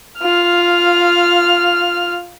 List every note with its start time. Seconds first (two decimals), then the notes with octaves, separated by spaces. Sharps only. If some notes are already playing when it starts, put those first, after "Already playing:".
0.19 F4 F6